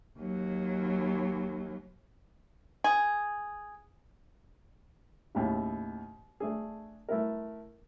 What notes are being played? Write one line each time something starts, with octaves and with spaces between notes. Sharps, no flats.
D#2 F#3
G#4
D#2 A2 C#3
A3 D4 G#4
A3 E4 A#4